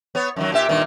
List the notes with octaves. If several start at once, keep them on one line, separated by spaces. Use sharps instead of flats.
B3 C#5
F#2 D#3 F#3
A#2 G4 E5
G2 A#2 D#3